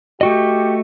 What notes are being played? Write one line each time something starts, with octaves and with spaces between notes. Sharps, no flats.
A3 F#4 G4 D#5